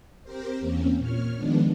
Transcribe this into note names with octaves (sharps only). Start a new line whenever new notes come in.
C4 G4 A#4 C5
E2 A#3 C4 C#4
A#2 C#5 F6
D#3 F3 G#3 B3 D4